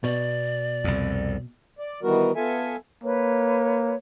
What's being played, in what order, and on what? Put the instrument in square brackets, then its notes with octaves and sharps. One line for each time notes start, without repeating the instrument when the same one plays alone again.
[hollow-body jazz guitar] B2 [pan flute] D5
[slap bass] C2 F2
[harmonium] D5
D#3 E3 G3 B3 F#4 A#4
B3 F4 A4 E5 G#5
[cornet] A#3 [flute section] B4 C#5